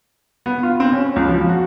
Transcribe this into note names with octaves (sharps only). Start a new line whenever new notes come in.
B3
F4
C4
C#4
C#2
F3
F#4